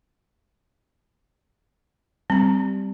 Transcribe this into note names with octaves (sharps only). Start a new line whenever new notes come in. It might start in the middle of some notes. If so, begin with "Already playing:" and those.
G3 C4 A#5